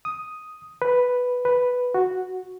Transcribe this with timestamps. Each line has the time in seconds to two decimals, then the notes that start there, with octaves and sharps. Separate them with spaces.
0.05 D#6
0.82 B4
1.45 B4
1.94 F#4